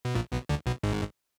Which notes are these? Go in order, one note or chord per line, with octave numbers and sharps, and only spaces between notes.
B2
A#1 A#2
B1 B2
D2 D3
B1 B2
G#1 G#2